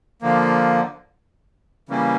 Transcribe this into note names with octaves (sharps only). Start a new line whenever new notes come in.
D3 F3 A#3
C#3 E3 G3 A#3 C#4